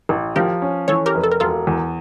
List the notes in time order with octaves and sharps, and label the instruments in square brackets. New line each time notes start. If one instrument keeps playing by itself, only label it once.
[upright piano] A1
[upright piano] F3 [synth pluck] G4 A#4
[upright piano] C#4
[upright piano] E3 [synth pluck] A4 C#5
[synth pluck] G4 A#4
[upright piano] F1
[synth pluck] A4
A#4
[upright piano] E1 [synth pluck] F4 A4
[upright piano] E2